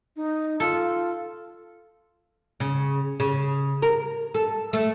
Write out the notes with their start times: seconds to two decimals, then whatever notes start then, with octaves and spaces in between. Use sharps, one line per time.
0.16 D#4
0.60 F4 A4
2.60 C#3
3.20 C#3
3.82 A#4
4.34 A4
4.73 A3